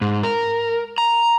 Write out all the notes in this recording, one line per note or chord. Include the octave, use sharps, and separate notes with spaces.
G#2
A#4
A#5